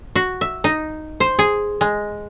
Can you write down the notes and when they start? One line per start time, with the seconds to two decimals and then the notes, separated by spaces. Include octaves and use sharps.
0.16 F#4
0.41 E5
0.64 D#4
1.20 C5
1.39 G#4
1.81 G#3